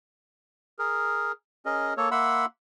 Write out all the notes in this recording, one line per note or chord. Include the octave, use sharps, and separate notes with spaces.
G#4 A#4
C#4 G#4 A#4 D#5
A#3 A4 C#5
A#3 E5 F#5 B5 C6 E6